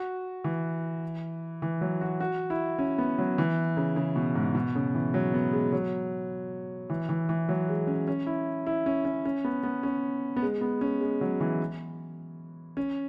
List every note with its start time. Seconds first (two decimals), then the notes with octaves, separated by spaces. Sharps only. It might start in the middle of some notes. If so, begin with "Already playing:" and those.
Already playing: F#4
0.44 E3
1.62 E3
1.81 F#3
2.01 F#4
2.20 F#4
2.50 E4
2.79 C#4
2.98 B3
3.18 F#3
3.38 E3
3.77 C#3
3.96 C#3
4.16 B2
4.35 G#2
4.55 B2
4.75 C#3
4.95 E3
5.14 F#3
5.34 B3
5.53 G#3
5.72 F#3
6.90 E3
7.09 E3
7.29 E3
7.49 F#3
7.69 G#3
7.87 C#4
8.08 C#4
8.26 E4
8.67 E4
8.86 C#4
9.05 C#4
9.25 C#4
9.44 B3
9.63 B3
9.83 C#4
10.36 B3
10.42 G#3
10.61 B3
10.81 C#4
11.01 G#3
11.21 F#3
11.40 E3
12.77 C#4